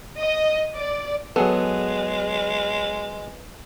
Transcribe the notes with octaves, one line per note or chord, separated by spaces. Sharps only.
D#5
D5
F#3 G#3 B3 G#4 A4